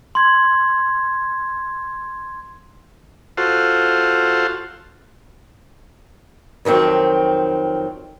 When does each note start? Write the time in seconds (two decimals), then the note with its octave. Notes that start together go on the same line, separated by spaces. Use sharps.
0.15 C6 G#6
3.37 F4 F#4 A4 C5
6.65 F2 D#3 F#3 C4